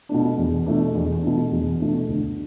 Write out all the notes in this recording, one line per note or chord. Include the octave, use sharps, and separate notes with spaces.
B2 A3 D4
E2
B2 A3 D4
E2
B2 A3 D4
E2
B2 A3 D4
D2